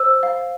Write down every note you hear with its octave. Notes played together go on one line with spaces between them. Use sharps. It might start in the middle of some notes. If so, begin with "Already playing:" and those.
Already playing: C5 E6
F5